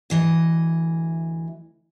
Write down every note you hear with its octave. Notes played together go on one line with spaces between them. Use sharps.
D2 E3 D#5